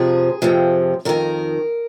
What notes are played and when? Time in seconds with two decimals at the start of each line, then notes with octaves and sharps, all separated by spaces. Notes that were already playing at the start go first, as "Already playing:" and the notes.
Already playing: F2 C3 F3 G#4
0.42 F2 C3 F3
1.05 F2 D#3 A#4